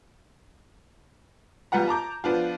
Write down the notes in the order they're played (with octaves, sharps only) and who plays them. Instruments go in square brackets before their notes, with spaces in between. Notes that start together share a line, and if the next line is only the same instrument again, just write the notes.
[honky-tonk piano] G3 B3 F4 F#5 A#5
A5 A#5 D6 G6
F3 B3 D4 F4